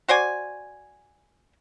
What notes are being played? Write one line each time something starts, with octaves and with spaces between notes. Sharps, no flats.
F#4 C5 D5 G#5